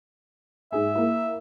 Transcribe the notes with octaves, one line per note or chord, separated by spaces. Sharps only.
G#2 G#4 E5
A#3 E4